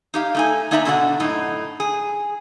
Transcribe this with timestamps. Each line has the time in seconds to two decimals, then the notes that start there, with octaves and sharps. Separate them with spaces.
0.14 D#4 G4 F5
0.35 A3 D#4 G#5
0.71 A#3 D#4 D5 E5 G#5 A#5
0.85 B2 D3 D4 F#4 C5 F#5
1.20 F#2 A2 D#4
1.80 G#4